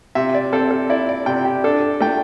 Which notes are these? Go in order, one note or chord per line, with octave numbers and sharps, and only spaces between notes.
C3 E5
D5
C4 A4
A4
E4 D5
D5
C3 G5
G4
D4 A4
A3 G5